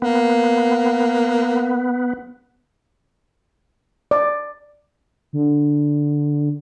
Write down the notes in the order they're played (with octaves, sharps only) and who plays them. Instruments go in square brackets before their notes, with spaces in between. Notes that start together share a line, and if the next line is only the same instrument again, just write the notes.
[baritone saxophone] A#3 [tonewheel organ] B3
[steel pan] D5
[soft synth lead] D3